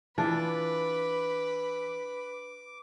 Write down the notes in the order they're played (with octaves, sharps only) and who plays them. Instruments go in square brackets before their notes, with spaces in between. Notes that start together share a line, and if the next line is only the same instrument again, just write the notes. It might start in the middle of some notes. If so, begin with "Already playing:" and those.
[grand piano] E3 [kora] D4 F4 [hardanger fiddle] B4 [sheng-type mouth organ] D6